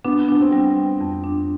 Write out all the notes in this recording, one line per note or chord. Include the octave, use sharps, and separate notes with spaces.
B3 D4
B3 D4
C4
G3
G3
F2
D4